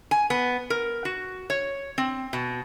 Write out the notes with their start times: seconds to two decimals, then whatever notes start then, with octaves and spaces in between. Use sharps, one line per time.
0.11 G#5
0.30 B3
0.70 A#4
1.05 F#4
1.50 C#5
1.98 C4
2.33 B2